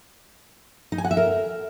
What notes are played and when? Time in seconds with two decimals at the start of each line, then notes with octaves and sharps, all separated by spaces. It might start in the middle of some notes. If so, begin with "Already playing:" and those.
0.92 D#4
0.98 G#5
1.05 F#5
1.11 E5
1.17 A#4